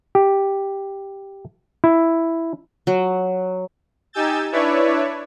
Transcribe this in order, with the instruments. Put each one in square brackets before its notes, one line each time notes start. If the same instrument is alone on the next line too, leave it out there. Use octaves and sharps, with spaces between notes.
[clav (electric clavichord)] G4
E4
[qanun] F#3
[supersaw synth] D#4 G4 G#5 E6 G6 A6
D4 E4 B4 C#5 D5 E5